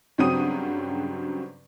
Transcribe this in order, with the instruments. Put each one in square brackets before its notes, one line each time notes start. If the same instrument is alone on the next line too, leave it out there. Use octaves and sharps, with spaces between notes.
[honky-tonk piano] G2 C#3 F#3 C4 D#6 D#7